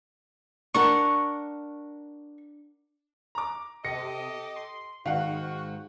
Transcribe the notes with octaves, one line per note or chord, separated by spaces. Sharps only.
D4 A#4 F#5 C#6
A#5 D6
C3 G4 A4 D#5 A#6 C#7
C6
G#2 D#3 F#4 F5 F#5